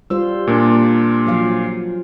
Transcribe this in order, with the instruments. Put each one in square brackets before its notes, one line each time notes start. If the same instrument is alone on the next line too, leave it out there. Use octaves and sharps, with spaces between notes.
[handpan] G3 F4 C5 [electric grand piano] E6
[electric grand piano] A#2 A#3 D4
[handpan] F3 F#3 F5